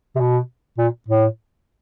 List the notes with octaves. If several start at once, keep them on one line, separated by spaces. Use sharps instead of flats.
C3
B2
A#2
A2